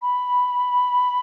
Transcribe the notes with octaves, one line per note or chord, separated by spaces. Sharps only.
B5